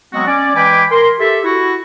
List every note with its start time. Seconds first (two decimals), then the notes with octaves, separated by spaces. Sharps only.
0.13 F#3 G#3 B3 C4 F#4
0.27 C#4 D5
0.56 E3 G#3 G5 G#5 B5 D6
0.91 A#4 C6
1.19 G4 A4 E5
1.44 E4 F#4